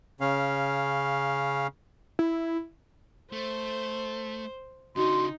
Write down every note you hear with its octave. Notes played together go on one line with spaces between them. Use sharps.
C#3 C#4 F5
E4
A3 C5
C#3 D4 D#4 F#4 C6